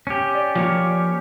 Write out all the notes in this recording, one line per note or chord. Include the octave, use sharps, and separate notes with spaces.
C#4 G4
D5
F3 A#3 C#5